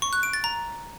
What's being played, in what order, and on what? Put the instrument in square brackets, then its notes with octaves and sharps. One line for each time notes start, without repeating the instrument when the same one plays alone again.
[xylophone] C#6
F#6
D7
A6
A#5